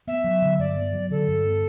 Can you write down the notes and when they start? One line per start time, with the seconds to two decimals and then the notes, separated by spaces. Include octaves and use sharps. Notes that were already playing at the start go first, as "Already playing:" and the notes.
0.07 B3 E5
0.24 F#3
0.42 D3
0.59 G2 D5
0.76 B3
0.93 F#3
1.10 D3 A4
1.28 G2
1.45 B3